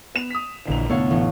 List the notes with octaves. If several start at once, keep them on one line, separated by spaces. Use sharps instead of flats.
B3 E7 F7
D#6 B6
A#1 D3 E3 A#3 F7
F1 A2 D3 B3 A4 C#5 F5
A1